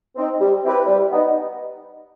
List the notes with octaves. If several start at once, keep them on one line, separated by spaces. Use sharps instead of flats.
C4 D#4
G3
C4 E4 G4 B4
G3
B3 D#4